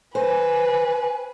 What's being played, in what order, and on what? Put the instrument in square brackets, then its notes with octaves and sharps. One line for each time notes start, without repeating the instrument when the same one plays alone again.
[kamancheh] B4 [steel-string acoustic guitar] C5 [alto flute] G#5